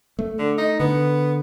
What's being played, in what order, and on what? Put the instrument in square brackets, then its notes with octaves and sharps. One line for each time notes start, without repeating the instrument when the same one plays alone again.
[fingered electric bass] A3
[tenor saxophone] D3
D#4
[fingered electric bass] D3 [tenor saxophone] B3